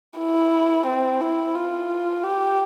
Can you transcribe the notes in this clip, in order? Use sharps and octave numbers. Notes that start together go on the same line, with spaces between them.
E4
C4
E4
F4
G4